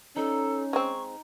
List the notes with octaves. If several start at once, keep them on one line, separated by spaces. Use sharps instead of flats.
C#4 D#4 A4
G#3 C4 C#6